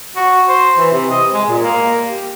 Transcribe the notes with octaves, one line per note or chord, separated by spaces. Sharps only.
F#4
C5
E3
C3
D#5
G#3
A#2
A#3
G4